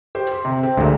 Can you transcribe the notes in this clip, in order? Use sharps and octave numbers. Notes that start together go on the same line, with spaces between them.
G4 C5
C6
C3
C4
D2 A#2 G#3